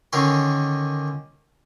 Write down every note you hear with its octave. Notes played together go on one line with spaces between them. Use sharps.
D3 D#3 C#4 A#4 C#5 C6